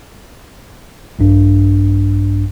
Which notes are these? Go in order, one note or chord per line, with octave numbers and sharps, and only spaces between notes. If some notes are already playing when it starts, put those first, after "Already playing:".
A#1 G2 D4